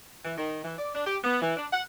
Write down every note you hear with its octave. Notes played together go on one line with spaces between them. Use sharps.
E3
D#3
E3
D5
D4
G4
B3
E3
D4
F#5